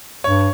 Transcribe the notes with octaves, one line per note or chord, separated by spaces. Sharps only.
G2 C#5